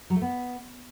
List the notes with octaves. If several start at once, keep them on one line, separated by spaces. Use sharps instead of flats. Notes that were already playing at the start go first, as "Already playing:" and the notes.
F#3
A3
B3